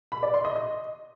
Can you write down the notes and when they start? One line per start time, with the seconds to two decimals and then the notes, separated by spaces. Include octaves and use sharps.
0.12 B5
0.23 D5
0.34 C6
0.45 D#5
0.56 D#5